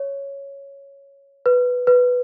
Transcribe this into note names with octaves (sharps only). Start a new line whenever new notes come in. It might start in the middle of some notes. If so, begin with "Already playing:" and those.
Already playing: C#5
B4
B4